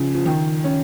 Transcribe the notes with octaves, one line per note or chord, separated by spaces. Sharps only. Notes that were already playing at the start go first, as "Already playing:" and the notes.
Already playing: C#3 F3
F3
D#3
C#4